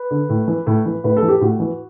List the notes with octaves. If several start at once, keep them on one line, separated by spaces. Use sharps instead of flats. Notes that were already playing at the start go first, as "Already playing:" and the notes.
Already playing: B4
D3
A2
E3
A2
E3
A2 B4
A4
E3
G4
A2 F#4
E3